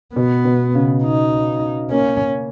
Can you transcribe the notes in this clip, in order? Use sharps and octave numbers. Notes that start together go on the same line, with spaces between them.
B2 B3
B2
C#3
D#4
A#3 C#4